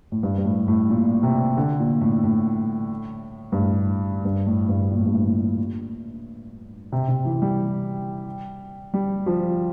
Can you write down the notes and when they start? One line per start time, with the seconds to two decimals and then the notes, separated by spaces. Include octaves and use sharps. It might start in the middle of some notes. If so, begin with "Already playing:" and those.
0.12 A2
0.23 G2
0.38 G2
0.44 A2
0.68 A2
0.90 A#2
1.23 C3
1.57 D3
1.80 A#2
2.01 A2
2.23 A2
3.52 G2
3.58 A2
4.25 G2
4.46 A2
4.69 G2
4.91 A#2
4.99 A2
5.06 G2
5.13 A2
5.25 A#2
6.92 C3
7.09 C3
7.25 E3
7.42 G3
8.94 G3
9.26 F3